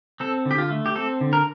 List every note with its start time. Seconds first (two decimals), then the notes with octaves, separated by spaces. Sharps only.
0.20 C4 A4
0.45 D3
0.51 G4
0.58 F4
0.70 A3
0.86 G4
0.96 C4 A4
1.21 D3
1.33 A#4